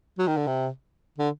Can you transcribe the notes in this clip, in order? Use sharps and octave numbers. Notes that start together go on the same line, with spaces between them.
F#3
D#3
D3
C3
D3